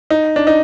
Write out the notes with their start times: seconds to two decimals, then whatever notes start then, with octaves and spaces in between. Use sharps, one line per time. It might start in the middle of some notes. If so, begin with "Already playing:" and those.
0.10 D#4
0.36 D4
0.47 D#4